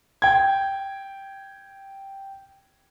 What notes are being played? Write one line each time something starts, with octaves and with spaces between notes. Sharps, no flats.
G5 G#6